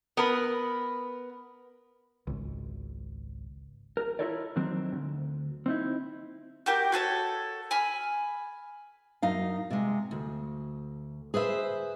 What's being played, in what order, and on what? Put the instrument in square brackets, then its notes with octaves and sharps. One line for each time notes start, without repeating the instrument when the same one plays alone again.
[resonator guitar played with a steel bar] B3 A#4 B4
[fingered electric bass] G#1 C#2
[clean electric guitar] A#4
E4 F4 A4 A#4 C#5 D5
F2 D#3 F#3 C4 D4
D2 G2
C4 D#4 E4
[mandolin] F#4 G4 A#4
F#4 G#4 A4 C#5
G#5 B5 F6
[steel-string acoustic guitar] F#2 D#4 F5
C3 G#3
D2
G#4 B4 C5 E5